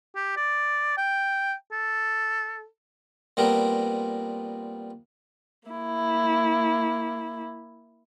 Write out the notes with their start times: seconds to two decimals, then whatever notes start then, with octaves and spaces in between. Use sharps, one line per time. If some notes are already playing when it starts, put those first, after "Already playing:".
0.16 G4
0.37 D5
0.97 G5
1.72 A4
3.37 A#2 G3 B3 C4 A#4
5.69 A#3 E4